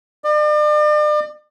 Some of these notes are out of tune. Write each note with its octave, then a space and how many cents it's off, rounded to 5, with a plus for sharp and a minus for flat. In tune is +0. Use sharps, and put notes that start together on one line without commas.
D5 +40